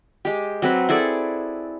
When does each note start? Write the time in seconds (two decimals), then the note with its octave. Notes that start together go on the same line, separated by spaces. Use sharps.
0.25 G#3 G4
0.62 F#3 C4 B4
0.89 E4 G#4 A4 D5